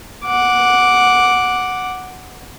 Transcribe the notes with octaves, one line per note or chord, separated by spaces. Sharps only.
F#5 D6